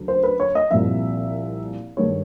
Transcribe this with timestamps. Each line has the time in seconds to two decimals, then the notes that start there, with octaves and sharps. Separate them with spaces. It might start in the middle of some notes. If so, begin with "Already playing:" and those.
Already playing: D2 C#3 F#3
0.08 C5
0.23 B4
0.40 C#5
0.55 D#5
0.71 C2 A#2 F3 E5
1.97 G2 D#3 G#3 C#5